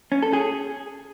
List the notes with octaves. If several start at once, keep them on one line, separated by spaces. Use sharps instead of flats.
C#4
A4
G#4